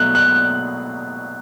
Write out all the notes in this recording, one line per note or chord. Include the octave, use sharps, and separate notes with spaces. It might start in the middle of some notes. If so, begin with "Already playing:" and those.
Already playing: B2 F#3 A3 F#6
F#6